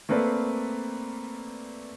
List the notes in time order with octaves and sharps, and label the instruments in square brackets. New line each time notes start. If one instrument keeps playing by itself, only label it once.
[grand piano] A3 A#3 C4 B4 D5